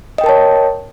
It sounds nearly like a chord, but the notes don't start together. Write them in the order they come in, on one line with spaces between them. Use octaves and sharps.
D#5 G5 A#4 A5 C#5